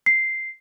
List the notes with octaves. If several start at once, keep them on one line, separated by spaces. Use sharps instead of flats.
C7